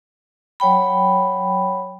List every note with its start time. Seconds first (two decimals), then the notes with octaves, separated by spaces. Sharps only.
0.60 F#3 C#5 G5 B5